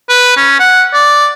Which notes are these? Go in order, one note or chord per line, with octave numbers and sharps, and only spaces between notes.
B4
C#4
F#5
D5